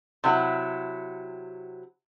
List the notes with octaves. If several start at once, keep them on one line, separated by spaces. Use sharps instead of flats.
C3 F#3 E4 F#5